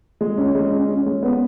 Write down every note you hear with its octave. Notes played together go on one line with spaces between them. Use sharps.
G#3
C#4
G#3
C#4
C#4
G#3
B3